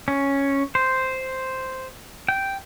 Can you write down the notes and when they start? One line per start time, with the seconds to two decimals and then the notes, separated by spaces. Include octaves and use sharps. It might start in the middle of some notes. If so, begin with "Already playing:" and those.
0.08 C#4
0.75 C5
2.29 G5